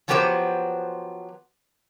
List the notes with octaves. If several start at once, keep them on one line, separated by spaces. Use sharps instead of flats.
F3 F#3 B3 G4 B4 C5